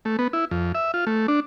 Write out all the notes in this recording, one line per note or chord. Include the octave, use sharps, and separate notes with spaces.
A3
B3
E4
F2
E5
F4
A3
D4